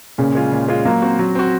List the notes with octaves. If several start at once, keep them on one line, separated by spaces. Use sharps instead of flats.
A#2 C#3
G#3 C#4 F4
A#2
G#3 C#4 F4
F#3 A#3
C4 F#4
F#3
C4 F#4